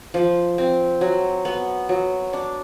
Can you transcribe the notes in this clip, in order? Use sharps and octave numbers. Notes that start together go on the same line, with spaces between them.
F3
C4
F#3
B3
F#3
D4